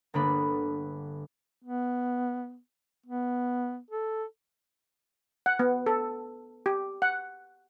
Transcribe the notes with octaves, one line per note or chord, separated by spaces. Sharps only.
G1 D3 A#3 B3 D4 B5
B3
B3
A4
F#5
B3
A4
G4
F#5